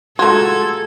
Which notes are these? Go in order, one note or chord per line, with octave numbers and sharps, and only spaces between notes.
G#3 A3 F4 F#4 A4 A#5 C6 G#6